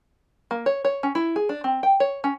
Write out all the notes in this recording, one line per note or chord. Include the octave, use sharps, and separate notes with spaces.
A#3
C#5
C#5
C#4
E4
G#4
D4
C4
G5
C#5
C#4